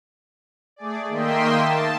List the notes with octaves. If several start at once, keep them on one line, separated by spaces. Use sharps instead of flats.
A3 G#4 D5
D#3 A#3 D#5 E5 G5 C6
A5